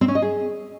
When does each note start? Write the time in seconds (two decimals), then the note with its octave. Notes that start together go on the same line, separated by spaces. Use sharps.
0.01 C4
0.08 C#4
0.15 D#5
0.22 G#4